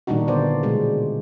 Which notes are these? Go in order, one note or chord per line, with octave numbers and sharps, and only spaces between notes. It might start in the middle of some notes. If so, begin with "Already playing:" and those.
A#2 D#3 G3 D4 D#4 F#4
D3 G3 A#3 B3 C5 D5
B2 G3 G#3